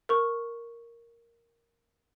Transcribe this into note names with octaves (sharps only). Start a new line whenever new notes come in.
A#4 C#6